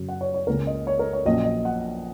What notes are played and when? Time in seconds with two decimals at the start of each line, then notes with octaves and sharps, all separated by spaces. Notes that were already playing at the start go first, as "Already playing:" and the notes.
Already playing: F#2 C#3 F#3 C#4
0.09 F#5
0.21 C#5
0.34 C#5
0.47 C#2 C#3 A#3 C#4 A#4
0.67 D#5
0.87 C#5
0.99 A#4
1.13 C#5
1.25 A#1 A#2 F#3 C#4 D#5
1.45 D#5
1.65 F#5